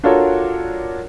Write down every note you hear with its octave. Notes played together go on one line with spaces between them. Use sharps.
D4 F4 F#4 A4 A#4 C#5